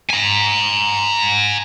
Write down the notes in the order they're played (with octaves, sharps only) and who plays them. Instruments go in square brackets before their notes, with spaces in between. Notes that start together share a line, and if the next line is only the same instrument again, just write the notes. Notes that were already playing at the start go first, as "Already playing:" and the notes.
[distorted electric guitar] G#5 A#5